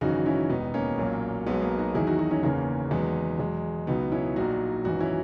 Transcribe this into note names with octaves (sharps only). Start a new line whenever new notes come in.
G#1 F#2 C#3 E3 D#4 F#4
C#4 E4
E1 D#2 D#3 B3 D#4
A#3 C#4
B1 A#2 F#3
B1 B2 F#3 G#3 B3
A#3
D#4 F#4
E2 D#3 F#3 E4 G#4
D#4 F#4
D#4 F#4
C#4 E4
F#1 E2 C#3 E3 A#3 C#4
E2 D#3 F#3 G#3 B3
E2 B2 F#3 G#3
C#2 B2 F#3 B3 D#4
C#4 E4
A#1 A#2 F#3 D#4 F#4
G#1 F#2 E3 D#4 F#4
C#4 E4